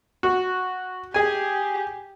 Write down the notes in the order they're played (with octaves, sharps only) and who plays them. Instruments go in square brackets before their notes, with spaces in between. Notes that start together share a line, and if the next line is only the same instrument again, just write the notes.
[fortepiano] F#4
[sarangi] G4 [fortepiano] G#4 G#5